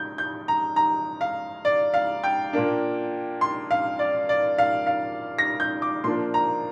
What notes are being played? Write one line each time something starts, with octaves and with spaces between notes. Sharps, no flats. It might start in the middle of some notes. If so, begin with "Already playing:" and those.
Already playing: G6
G6
A#5
A#5
F5
D5
F5
G5
A#2 A#3 D4
C6
F5
D5
D5
F5
F5
A#6
G6
D6
A#2 F3 A#3 D4 C6
A#5